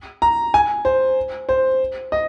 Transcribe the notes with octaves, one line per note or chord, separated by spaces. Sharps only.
A#5
G#5
C5
C5
D#5